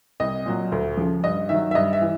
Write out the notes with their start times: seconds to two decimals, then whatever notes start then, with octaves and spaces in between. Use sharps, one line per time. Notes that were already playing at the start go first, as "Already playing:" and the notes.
0.20 C2 D#5
0.46 A#2 F#3
0.72 D2
0.97 C#3 F3
1.24 G2 D#5
1.49 D#3 F#3 E5
1.71 E5
1.75 G2 D#5
1.93 E5
2.02 E3